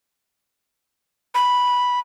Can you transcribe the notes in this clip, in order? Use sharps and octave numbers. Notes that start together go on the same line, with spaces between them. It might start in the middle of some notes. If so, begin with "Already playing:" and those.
B5